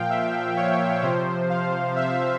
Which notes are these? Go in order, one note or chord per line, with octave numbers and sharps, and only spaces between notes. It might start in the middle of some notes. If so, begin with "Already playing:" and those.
Already playing: A#2 F3 F5 G5
E5
C#5
C3 F3 C5
F5
E5